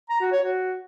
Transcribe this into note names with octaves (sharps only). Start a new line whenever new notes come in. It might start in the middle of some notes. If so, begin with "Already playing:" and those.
A#5
F#4
C#5
F#4